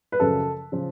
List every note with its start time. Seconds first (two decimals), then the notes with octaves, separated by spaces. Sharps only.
0.12 B4
0.20 F#2 C#3 F3 A4
0.72 C#3 F3